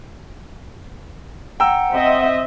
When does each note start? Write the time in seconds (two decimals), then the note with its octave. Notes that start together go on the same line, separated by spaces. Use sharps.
1.60 F#5 G5 A#5 E6
1.94 C4 D#5 E5